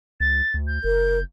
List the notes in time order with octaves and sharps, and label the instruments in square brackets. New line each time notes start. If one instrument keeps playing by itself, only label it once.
[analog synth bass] C#2 [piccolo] A6
[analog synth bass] D2
[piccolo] G6
[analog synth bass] F#1 [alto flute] A#4